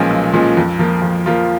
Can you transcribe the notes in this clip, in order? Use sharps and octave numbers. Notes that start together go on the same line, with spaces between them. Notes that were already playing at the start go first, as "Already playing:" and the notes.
Already playing: B1 A#2 F3 G#3 C#4
B1
A#2 F3 G#3 C#4
F2
F3 A#3 F4
F2
F3 A#3 F4